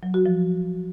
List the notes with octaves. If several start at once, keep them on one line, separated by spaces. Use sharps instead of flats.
F#3
F#4
F3